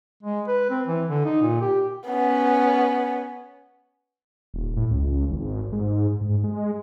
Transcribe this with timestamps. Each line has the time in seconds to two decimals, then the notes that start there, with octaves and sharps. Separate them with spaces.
0.23 G#3
0.48 B4
0.70 C4
0.87 E3
1.09 D3
1.25 D#4
1.42 A#2
1.61 G4
2.07 B3 C#4
4.54 D#1
4.77 A2
4.91 C#2
5.31 G#1
5.72 G#2
6.21 G#2
6.44 G#3